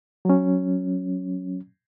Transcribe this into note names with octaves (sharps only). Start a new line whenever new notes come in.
F#3 C#4